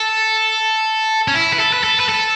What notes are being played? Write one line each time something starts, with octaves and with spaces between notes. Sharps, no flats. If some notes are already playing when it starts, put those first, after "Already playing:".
Already playing: A4
C#4
E4
B4
A4
B4
A4
B4
A4